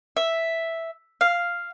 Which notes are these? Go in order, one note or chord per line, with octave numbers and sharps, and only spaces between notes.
E5
F5